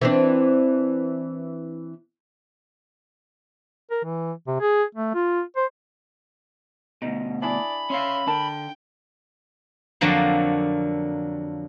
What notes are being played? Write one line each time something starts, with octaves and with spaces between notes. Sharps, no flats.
E3 C4 D4
A#4
E3
C3
G#4
A3
F4
C5
D2 B2 D#4
D4 E4 G#4 D5 B5
C#4 E5 F5 C6
D3 A#4 G5 A5
F2 D3 F#3 A#3 C5